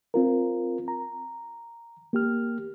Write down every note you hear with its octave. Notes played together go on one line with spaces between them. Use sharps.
C4 F4 A#4
A#5
A#3 G4 F6